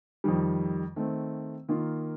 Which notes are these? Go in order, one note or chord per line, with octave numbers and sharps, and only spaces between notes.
F2 D#3 G3
D#3 A3 C4
D#3 A#3 F4